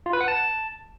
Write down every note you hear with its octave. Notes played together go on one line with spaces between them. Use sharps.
F4
B4
F#5
A5